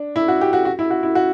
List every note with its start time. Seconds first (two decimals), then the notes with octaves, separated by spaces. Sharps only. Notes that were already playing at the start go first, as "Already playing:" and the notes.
Already playing: D4
0.16 E4
0.28 F#4
0.41 G4
0.53 F#4
0.65 F#4
0.79 E4
0.90 F#4
1.03 E4
1.15 F#4